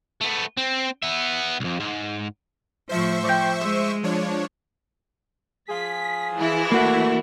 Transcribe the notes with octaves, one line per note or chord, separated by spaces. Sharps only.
A3 B3
C4
B3 E5
C2 F2
G#2
A2 F3 C5 E5 C#6
F3 D5 G5
G#3 E6
F3 D4 C#5
F3 F4 G#4 B6
E3 E4
A3 A#3 F#4